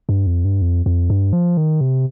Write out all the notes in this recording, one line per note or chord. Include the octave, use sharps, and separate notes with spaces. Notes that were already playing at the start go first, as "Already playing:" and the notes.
G2
F2
G2
F2
F2
G2
F3
D#3
C3